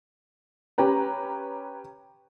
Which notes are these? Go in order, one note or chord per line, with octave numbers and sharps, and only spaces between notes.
C#4 G4 B4 A#5